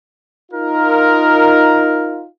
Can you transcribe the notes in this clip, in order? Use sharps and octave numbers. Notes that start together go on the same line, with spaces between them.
D#4 F4 A#4